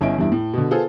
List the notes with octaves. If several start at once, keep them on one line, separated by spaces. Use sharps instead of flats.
G1 C#4 E4 D#5 G#5 D7
E2 G2 D4 E4
A2
B2 D3
B3 F4 G#4 A4 C5